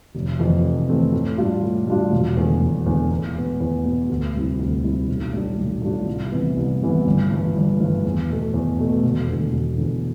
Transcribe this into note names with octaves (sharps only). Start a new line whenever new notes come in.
F1
F2 E3 A3 C4
F1
F2 E3 A3 C4
A2
G3 D4 F4
A2
G3 D4 F4
E1
E2 D3
E1
E2 D3
E2
B2 B3
E2
B2 B3
D2
C3 G3 C4 E4
D2
C3 G3 C4 E4
B1
A2 G3 D4 F4
B1
A2 G3 D4 F4
C2
C3 E3 B3
C2
C3 E3 B3
G1
G2 E3
G1
G2 E3
E2
B2 A3
E2
B2 A3
E1
E2 D3
E1
E2 D3